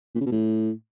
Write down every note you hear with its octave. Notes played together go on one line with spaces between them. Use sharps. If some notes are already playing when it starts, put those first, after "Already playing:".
A#2
C#3
B2
A2